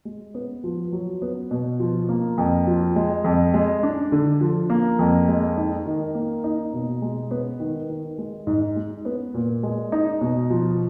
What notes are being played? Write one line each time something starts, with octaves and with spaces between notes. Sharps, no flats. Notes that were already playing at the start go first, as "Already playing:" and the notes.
G#3
B3
F3
F#3
B3
B2
F3
A#3
F2
F3
G#3
F2
G#3
D4
D3
F3
A#3
F2
G#3
D#4
D#3
A#3
D#4
B2
G#3
B3
D#3
D#3
G#3
G#2
G#3
B3
A#2
G#3
D#4
B2
F3